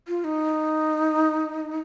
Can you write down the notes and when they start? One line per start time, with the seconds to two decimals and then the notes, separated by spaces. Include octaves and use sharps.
0.08 F4
0.24 D#4